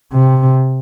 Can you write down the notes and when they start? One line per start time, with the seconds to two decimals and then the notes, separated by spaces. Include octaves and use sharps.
0.13 C3